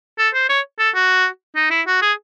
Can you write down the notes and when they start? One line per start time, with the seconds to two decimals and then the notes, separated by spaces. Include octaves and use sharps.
0.18 A4
0.34 C5
0.49 C#5
0.79 A4
0.95 F#4
1.56 D#4
1.71 E4
1.87 F#4
2.02 G#4